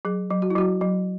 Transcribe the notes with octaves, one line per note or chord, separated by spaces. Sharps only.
F#3 G#4
F#3
F#4
E4
F#3 F#4
F#3